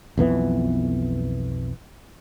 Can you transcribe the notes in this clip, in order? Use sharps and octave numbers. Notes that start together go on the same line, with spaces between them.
B1 F2 E3 B3